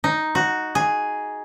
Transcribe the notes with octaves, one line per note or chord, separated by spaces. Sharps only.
D#4
F#4
G#4